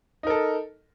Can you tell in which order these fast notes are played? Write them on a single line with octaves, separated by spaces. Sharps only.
D#4 A#4 A4